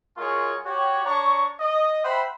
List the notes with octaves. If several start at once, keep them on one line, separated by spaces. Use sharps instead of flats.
G#3 F4 F#4 G#4 A#4 C#5
F#4 G4 C#5
D4 C#5 A#5 C#6
D#5
C5 E5 F#5 G5 B5